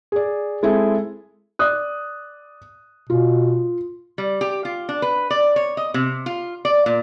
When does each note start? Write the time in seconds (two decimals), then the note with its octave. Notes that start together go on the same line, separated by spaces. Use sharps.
0.12 G#4 D5
0.63 G#3 C4 E4 G#4 A4
1.59 D5 D#6 F#6
3.10 B2 F4
4.18 G3
4.41 G4
4.65 F4
4.89 D4
5.02 B4
5.30 D5
5.56 C#5
5.77 D#5
5.94 C3
6.26 F4
6.65 D5
6.86 A#2